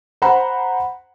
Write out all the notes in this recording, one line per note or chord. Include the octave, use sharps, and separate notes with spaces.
C5 F#5 A#5 B5